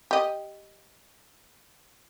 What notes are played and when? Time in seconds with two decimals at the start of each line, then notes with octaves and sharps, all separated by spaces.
0.11 G4 D#5